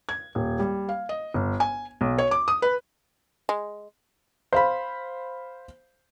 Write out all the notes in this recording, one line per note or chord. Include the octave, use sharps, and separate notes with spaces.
G#6
D#1
G3
F5
D#5
G1
G#5
B1
C#5
D6
D#6
B4
G#3
C5 F5 B5